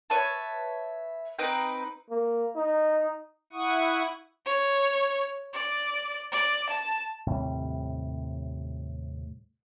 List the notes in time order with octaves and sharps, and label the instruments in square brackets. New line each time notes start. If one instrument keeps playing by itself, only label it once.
[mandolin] B4 C#5 E5 A5
C4 D#4 B4 G5
[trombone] A#3
D#4
[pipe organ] E4 F#5 C#6 D#6
[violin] C#5
D5
D5
A5
[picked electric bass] D#2 A2 C3 G3